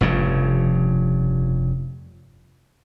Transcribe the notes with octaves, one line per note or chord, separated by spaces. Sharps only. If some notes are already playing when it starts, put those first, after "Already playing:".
F1 G2 C#3 F3